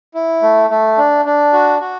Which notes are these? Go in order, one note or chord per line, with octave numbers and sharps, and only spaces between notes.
E4
A3
A3
D4
D4
F#4
F#4